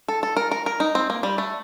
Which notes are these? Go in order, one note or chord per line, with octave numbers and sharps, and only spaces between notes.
A4
A4
A#4
A#4
A#4
D#4
C4
A#3
G3
A3